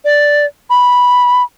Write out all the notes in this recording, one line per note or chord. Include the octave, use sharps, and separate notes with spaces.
D5
B5